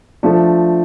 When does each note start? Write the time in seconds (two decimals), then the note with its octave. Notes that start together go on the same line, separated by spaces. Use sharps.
0.23 F3 A3 D4